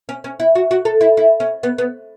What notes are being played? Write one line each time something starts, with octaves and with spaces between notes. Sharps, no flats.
C#4
C#4
E4
F#4
F#4
A4
E4
E4
C#4
B3
B3